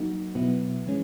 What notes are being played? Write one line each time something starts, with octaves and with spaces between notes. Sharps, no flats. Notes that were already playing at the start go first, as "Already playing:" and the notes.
Already playing: F#3 A#3 D#4 F#4
B2 F#3 B3 E4
E3 G#3 C#4